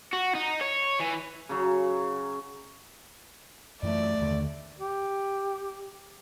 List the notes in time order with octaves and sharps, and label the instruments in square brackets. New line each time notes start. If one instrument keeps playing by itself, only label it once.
[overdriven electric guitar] F#4
D#4
C#5
E3
[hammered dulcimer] C#3 F#3
[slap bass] F#2 E3 F#3 [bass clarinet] A3 [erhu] D5
[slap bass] D#2 D3
[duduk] G4